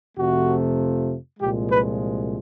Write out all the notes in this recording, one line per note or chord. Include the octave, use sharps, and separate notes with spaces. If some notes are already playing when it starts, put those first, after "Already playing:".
F2 C3 F3 A3 F#4
C2 A#2 F3 G#3 G4
B4